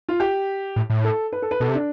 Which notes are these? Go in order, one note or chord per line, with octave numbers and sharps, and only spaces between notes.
F4
G4
A2
A2
A4
B4
A4
B4
B2 A4
C3
D4